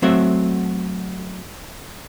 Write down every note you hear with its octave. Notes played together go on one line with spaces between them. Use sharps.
F#3 A3 C4 F#4 E5